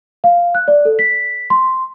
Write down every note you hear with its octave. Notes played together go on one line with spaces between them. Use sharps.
F5
F#6
D5
A4
B6
C6